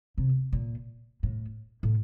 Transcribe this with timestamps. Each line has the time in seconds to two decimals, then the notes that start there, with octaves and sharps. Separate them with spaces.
0.18 C3
0.52 A#2
1.23 A2
1.83 A2